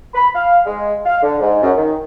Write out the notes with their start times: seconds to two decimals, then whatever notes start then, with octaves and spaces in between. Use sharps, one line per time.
0.14 B5
0.34 F5
0.65 G#3
1.05 F5
1.22 D3
1.40 G#2
1.63 F#2
1.77 D#3